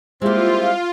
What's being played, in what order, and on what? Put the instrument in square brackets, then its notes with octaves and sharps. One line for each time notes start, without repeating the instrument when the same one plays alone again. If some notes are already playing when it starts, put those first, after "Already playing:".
[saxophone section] G3 C4 E4 [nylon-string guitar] G#3 A#3 [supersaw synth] F4